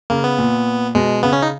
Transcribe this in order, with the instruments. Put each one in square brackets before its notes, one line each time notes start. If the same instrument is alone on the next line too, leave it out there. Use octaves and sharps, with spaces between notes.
[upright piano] C#3 [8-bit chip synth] A#3
[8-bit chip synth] B3
[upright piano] A#2
[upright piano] B2 [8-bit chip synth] G#3
[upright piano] C#3 [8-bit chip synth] B3
[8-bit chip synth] C#4
D#4